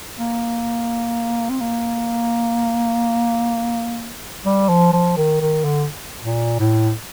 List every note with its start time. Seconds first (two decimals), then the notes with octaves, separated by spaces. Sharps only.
0.18 A#3
1.49 C4
1.61 A#3
4.46 G3
4.69 F3
4.93 F3
5.17 D#3
5.41 D#3
5.64 D3
6.24 A#2
6.60 A2